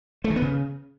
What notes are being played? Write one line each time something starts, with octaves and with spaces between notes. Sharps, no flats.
A3
D#3
B3
C#3